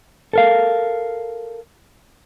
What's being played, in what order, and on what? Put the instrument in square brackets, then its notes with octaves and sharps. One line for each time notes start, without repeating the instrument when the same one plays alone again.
[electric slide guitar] A4 A#4 F5